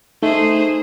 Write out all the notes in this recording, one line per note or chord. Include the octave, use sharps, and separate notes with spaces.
A3 D#4 G#4 C5